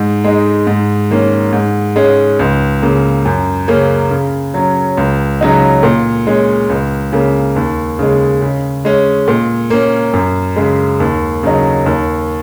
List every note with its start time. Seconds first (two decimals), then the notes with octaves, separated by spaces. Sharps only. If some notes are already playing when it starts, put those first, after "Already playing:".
Already playing: G#2
0.24 G#3 D#4
0.67 G#2
1.11 D#3 A#3 C#4
1.53 G#2
1.96 G#3 C#4
2.39 C#2
2.82 C#3 A#3
3.25 F#2
3.68 C#3 A#3 C#4
4.11 C#3
4.54 F#3 C#4
4.98 C#2
5.41 C#3 F#3 D#4
5.83 A#2
6.27 G#3 C#4
6.70 C#2
7.13 C#3 A#3
7.56 D#2
7.99 C#3 G#3
8.42 C#3
8.85 G#3 C#4
9.28 A#2
9.70 A#3 C#4
10.14 F#2
10.56 C#3 G#3
11.00 D#2
11.43 C#3 F#3 D#4
11.86 D#2